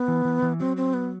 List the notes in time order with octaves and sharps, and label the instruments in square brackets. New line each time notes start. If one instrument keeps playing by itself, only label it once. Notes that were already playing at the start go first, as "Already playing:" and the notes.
Already playing: [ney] B3
[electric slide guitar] E3
E3
E3
[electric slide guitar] F#3 [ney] C4
[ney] C4
B3